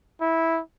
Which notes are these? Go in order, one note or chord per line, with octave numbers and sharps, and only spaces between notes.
E4